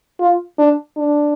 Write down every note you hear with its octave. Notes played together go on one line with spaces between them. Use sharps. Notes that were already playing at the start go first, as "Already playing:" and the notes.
F4
D4
D4